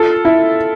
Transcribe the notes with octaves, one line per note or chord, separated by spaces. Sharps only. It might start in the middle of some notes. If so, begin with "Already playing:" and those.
Already playing: F4 A4
E4